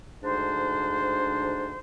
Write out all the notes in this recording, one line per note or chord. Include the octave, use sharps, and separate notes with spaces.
D2 G#2 D4 C5